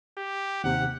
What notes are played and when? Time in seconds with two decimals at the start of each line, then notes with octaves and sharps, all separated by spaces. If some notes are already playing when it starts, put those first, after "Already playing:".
0.18 G4
0.64 D#2 C3 F#5